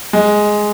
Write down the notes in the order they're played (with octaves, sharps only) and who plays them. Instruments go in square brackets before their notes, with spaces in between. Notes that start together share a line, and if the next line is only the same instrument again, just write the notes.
[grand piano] G#3